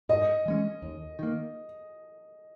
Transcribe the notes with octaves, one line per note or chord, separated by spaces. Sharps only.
G#2 D#5
E3 G#3 C#4
D#2
D#3 A#3